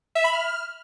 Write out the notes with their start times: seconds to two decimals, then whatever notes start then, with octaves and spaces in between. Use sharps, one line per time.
0.15 E5
0.24 B5
0.33 F6